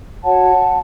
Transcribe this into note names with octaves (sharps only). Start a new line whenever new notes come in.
F#4 C#5 F#5 A5